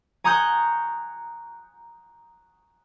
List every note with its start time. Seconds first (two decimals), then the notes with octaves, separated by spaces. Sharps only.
0.24 G#5 A#5 C#6 D#6 F#6 G6